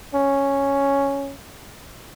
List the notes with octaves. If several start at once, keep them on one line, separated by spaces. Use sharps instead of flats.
C#4